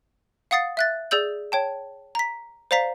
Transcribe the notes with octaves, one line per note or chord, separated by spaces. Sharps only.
F5 F#5 D#6 A6 C7
E5 F#6 A6
G#4 D5 E6 G6 F#7
C#5 G5 A5
A#5 B6
C5 D5 F5 A#5 B6 C7